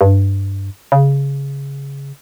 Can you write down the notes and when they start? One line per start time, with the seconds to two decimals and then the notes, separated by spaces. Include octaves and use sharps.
0.01 G2
0.92 C#3